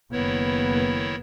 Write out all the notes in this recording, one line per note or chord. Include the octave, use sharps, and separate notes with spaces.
F#1 D#3 B3 E4 C#5